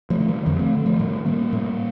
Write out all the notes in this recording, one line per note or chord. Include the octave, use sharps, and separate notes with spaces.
F3 A3
D3
D#3 G3
F2 D3 F3
A3 C4
D3
F3 A3
A2 D#3 G3
G3 A#3
A2